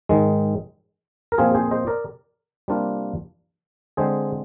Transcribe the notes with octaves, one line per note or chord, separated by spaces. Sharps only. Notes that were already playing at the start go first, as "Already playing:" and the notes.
G#2 D#3 G#3
A#4
A#2 F3 C4 F4 G#4
G#4 C5
C5 D#5
A#4 D5
C3 G3 A#3 D4 F4
D3 G#3 C4 G#4 C5